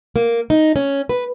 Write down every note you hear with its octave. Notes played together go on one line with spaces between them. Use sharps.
A#3
D#4
C#4
B4